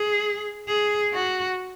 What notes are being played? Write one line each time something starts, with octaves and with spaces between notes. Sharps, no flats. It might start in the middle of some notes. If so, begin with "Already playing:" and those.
Already playing: G#4
G#4
F#4